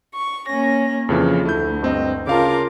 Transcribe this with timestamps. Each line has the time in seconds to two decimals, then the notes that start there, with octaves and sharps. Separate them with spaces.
0.14 C#6
0.48 A#3 C#4 A#6
1.09 F2 C#3 E3 F3
1.45 D2 A3 E4 G6
1.82 G2 C4 D#5
2.27 C#3 F4 A#4 F5 A5 D6